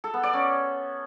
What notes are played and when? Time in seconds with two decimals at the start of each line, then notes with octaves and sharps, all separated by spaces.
0.04 A4
0.14 B3
0.23 D5
0.33 C#4